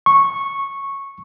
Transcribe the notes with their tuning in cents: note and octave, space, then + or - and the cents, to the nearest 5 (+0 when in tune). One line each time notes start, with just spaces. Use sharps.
C#6 -10